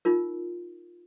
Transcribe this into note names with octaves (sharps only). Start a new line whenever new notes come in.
D#4 F4 A#4